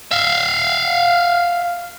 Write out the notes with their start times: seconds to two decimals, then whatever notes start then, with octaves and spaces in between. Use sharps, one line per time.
0.11 E5 F5